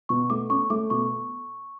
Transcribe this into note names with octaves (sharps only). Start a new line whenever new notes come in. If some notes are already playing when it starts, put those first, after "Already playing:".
B2 C#6
A3 D6
C#4 C#6
A3 D6
B2 C#6